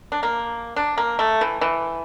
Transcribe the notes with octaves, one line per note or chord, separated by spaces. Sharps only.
D4
A#3
D4
A#3
A3
E3
E3